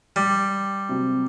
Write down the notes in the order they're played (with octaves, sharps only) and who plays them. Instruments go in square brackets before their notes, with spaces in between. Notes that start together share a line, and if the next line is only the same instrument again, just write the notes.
[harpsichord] G3
[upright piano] C3 F#3 C4